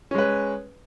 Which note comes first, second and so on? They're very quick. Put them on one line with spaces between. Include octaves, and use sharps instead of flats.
C#4 G#3 B4